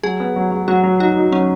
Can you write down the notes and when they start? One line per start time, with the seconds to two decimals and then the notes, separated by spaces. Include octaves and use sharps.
0.03 F#3 G#4
0.20 B3
0.36 F#3
0.51 F#3
0.68 F#3 F#4
0.83 F#3
1.00 D#4 F#4
1.17 D#4
1.32 F#3 C#4